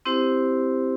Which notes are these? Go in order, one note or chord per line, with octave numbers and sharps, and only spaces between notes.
C4 E4 G4 C5